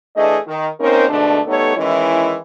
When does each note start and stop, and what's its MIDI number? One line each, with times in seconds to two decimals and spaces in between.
0.16 0.38 52
0.16 0.38 57
0.16 0.38 62
0.16 0.38 68
0.16 0.38 75
0.47 0.68 51
0.80 1.06 58
0.80 1.06 60
0.80 1.06 61
0.80 1.06 63
0.80 1.06 70
0.80 1.06 72
1.09 1.40 44
1.09 1.40 47
1.09 1.40 50
1.09 1.40 57
1.09 1.40 62
1.47 1.77 55
1.47 1.77 57
1.47 1.77 59
1.47 1.77 63
1.47 1.77 69
1.47 1.77 73
1.77 2.38 51
1.77 2.38 52
1.77 2.38 56
1.77 2.38 61
1.77 2.38 64